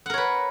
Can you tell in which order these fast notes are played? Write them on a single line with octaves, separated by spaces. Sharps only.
F#5 A#4 C#5 B4